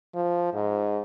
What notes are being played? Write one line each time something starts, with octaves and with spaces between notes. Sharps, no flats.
F3
G#2